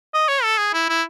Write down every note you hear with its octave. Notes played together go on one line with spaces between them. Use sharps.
D#5
C#5
A4
G#4
E4
E4